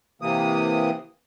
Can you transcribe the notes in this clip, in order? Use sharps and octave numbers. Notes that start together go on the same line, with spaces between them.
C3 E3 A#3 D#6